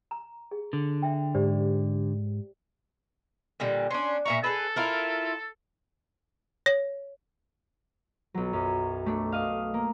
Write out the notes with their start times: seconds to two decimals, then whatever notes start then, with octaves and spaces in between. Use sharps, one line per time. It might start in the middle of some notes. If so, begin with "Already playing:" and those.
0.11 A#5
0.51 G#4
0.73 D3
1.02 E5 G5
1.35 G#2 G4 C5 D5
3.60 A#2 D3 G3
3.91 C#4 D4 C6
4.26 A#2 E5 A#5 C#6
4.44 G#4 A4 B4
4.76 E4 F4 A#4
6.66 C#5
8.34 B1 F#3
8.53 F#2
9.06 A3 D4
9.32 D#5 F5
9.74 A#3